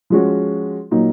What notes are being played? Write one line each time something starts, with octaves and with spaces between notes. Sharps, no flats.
F3 G#3 C#4 F#4
A#2 F#3 A#3 D#4